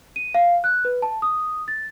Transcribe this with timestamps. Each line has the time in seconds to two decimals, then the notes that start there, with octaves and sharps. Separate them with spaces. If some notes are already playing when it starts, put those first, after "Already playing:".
0.16 D#7
0.34 F5
0.64 F#6
0.85 B4
1.02 A5
1.22 D#6
1.68 A6